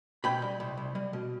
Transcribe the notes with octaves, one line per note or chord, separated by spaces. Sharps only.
B2 G5 B5
G3
C2
C2
G3
B2